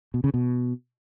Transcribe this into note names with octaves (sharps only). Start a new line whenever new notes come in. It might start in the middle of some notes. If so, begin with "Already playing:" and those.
B2
C#3
B2